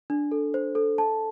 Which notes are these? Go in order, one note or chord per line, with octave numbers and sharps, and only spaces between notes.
D4
A4
C5
A4
A5